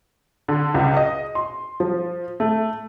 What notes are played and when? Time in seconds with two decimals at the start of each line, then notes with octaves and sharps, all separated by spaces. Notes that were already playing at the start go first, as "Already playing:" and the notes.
0.48 D3
0.74 C#2
0.97 D#5
1.35 C6
1.80 F3
2.40 A3